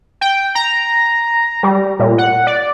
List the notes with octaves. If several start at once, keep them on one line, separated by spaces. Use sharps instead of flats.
G5
A#5
G3
A#2
F#5
D5